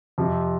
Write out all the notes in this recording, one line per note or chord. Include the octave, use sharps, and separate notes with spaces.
F2 C3 F3